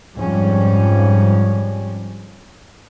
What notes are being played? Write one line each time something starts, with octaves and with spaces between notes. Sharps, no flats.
F2 G#2 F3 G3 C#4